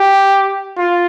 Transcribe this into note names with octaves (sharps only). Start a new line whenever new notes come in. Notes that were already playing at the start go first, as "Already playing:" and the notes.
Already playing: G4
F4